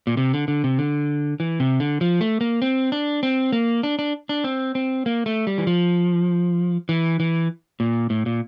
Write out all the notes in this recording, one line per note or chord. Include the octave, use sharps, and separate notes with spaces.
A#2
C3
D3
D3
C3
D3
E3
C3
D3
F3
A3
A#3
C4
D4
C4
A#3
D4
D4
D4
C4
C4
A#3
A3
G3
E3
F3
E3
E3
A#2
A2
A#2